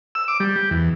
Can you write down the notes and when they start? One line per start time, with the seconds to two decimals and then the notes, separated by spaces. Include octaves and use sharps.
0.15 E6
0.28 D6
0.40 G3
0.56 G4
0.71 E2